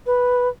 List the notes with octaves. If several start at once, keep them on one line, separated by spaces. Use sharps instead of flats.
B4